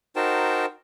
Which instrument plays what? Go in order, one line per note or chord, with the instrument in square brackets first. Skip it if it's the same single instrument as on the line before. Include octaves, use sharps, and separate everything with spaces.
[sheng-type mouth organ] D#4 F#4 A#4 C5 G5 A5